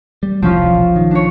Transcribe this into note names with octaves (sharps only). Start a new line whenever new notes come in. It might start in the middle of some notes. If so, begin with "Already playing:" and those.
G3
E1 C2 E3 F3 C#4 F4
B1
D#3
D4 C#5